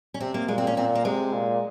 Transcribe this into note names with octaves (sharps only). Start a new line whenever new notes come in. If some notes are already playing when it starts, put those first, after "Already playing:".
C#4
C3 C4
A#3
A#2 G#3
C4
C#4
A#2 C4
A#3
C3 G#3
A#2